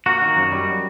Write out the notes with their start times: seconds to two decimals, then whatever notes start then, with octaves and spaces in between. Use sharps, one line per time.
0.06 A#3 F#4
0.22 D#3
0.37 F#2
0.52 G3